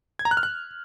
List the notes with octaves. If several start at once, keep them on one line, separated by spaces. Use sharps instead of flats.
G#6
A#5
F#6
F6
F#6